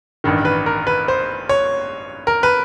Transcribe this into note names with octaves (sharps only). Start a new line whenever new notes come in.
A1 G2 D#3
B4
A#4
B4
C5
C#5
A#4
B4